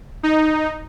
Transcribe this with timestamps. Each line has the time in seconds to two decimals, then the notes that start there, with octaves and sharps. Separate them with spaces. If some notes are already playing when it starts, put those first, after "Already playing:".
0.23 D#4